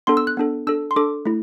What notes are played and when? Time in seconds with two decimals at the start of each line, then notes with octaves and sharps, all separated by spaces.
0.07 B3 D4 A4 C6
0.17 E6
0.27 F#6
0.37 B3 D4 A4
0.67 D4 A4 E6
0.91 C6
0.96 D4 A4 D6
1.26 A3 E4